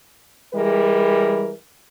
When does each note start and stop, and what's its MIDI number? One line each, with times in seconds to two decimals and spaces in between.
0.54 1.51 52
0.54 1.51 55
0.54 1.51 56
0.54 1.51 68
0.54 1.51 70